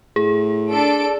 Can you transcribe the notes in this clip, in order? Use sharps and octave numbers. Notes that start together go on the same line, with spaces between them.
A2 G#4
D4 A4 D7